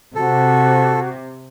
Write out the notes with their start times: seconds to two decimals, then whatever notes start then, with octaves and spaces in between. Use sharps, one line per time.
0.15 C3 F#4 A4